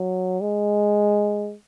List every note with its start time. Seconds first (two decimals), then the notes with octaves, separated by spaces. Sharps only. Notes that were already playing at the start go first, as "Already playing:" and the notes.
Already playing: F#3
0.41 G#3